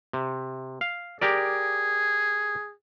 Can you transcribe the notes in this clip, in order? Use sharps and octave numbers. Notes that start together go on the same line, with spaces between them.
C3
F5
G4 G#4 A#4 D5